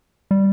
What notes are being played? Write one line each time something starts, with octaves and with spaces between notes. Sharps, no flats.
G3